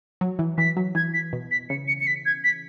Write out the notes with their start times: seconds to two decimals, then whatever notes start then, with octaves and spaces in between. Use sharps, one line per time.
0.21 F#3
0.39 E3
0.58 E3 B6
0.77 F#3
0.95 E3 G#6
1.14 B6
1.33 B2
1.51 B6
1.70 C#3 C#7
1.88 C#7
2.00 C#7
2.07 B6
2.26 G#6
2.44 B6